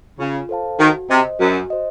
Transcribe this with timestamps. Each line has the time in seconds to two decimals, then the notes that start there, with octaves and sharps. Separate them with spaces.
0.19 C#3 F4
0.49 A4 C5 F5 A5
0.79 D#3 F#4
1.10 C3 C5 D#5
1.40 F#2 F#4
1.70 C5 D#5